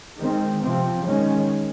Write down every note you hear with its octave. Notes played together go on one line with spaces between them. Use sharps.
D#3 G#3 C4
C3 F3 C4
D#3 G#3 C#4